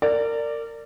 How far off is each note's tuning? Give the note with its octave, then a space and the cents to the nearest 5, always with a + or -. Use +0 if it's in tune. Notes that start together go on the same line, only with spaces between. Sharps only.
A#4 -30 D5 +0